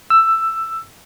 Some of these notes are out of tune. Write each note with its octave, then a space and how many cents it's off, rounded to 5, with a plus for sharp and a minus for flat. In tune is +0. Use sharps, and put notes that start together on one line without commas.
E6 +10